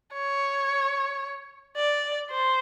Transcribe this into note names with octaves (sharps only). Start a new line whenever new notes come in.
C#5
D5
C5